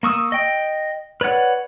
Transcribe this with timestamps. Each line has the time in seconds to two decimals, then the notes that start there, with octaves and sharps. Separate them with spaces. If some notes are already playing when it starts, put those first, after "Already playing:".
0.03 A#3 C#6 D#6 E6
0.32 D#5 G5
1.21 B4 C#5 D5 F#5